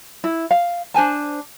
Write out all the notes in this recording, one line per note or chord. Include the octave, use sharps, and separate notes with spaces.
E4
F5
D4 C5 G#5 A5